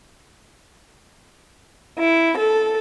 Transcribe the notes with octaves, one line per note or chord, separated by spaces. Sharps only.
E4
A4